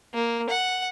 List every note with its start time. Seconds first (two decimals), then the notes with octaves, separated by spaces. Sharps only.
0.14 A#3
0.49 F#5